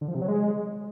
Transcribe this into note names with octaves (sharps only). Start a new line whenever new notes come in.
D3
F3
C3
F#3
G#3